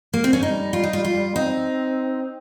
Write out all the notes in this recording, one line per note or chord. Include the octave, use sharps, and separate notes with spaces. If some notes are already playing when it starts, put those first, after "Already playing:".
A#3
C4
C#4
G3 D#4
F4
D#4
F4
F4
C4 D#4